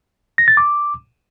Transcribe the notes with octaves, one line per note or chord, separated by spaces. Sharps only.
A#6
A6
D6